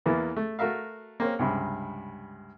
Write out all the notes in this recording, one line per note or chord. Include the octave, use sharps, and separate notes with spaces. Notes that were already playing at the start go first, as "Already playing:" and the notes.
E2 E3 A#3 B3
A3
A3 F#4 A#4 E5 F5
A#3 C4 C#4
C#2 G2 C3